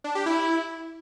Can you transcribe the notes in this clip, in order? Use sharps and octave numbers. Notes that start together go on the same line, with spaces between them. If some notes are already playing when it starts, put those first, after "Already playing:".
D4
G4
E4